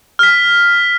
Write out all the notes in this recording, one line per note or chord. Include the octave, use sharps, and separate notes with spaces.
F6 B6